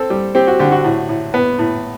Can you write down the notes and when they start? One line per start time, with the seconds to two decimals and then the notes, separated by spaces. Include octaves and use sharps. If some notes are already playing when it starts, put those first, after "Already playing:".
Already playing: C4 A4
0.10 G3
0.35 C4 G4
0.47 F#4
0.59 D3 G4
0.72 F#4
0.85 A2
1.09 A2
1.34 B3
1.59 A2